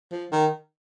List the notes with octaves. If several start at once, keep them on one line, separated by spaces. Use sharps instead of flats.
F3
D#3